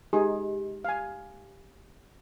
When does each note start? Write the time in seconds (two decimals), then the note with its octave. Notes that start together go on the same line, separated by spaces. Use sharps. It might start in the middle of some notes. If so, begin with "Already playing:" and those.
0.13 G#3 D#4 G4 G#4
0.85 F5 G#5